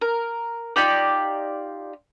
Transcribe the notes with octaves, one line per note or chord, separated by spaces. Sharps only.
A#4
D#4 F4 G4 D5